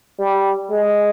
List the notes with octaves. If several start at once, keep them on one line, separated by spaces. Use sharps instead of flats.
G3
G#3